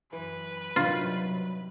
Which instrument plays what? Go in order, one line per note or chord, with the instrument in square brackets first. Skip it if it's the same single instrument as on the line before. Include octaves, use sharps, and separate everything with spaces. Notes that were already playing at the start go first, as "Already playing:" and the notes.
[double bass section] F#2 [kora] E3 [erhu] B4
[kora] G2 D#3 G3 [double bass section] C3 F#3 [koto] F4